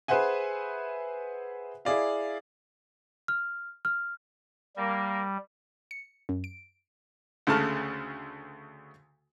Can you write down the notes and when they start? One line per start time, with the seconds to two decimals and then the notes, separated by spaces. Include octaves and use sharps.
0.08 G#4 B4 C5 E5 F#5 G#5
1.85 E4 G#4 D5 F5
3.28 F6
3.85 F6
4.76 G3 A#3
5.91 C#7
6.29 F#2
6.44 D7
7.47 D2 C#3 A3 A5 F6